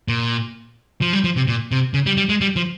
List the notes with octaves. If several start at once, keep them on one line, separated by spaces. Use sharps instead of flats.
A#2
F3
G3
F3
C3
A#2
C3
C#3
G3
G3
G#3
G3
F3